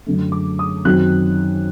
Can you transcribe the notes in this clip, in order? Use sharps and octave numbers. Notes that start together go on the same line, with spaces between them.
F#2 D3 A3
D6
D#6
F#2 D#3 F#3 C4 D#4 F#6